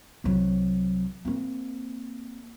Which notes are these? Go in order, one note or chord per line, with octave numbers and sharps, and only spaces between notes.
C2 F#3
A#3 C4